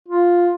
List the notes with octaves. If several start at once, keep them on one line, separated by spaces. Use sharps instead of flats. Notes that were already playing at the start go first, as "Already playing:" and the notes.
F4